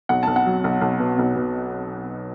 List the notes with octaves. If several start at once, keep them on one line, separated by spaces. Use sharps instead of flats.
B1 F#5
B1 A5
F#5
F#3
B1
B1
B2
B1
B2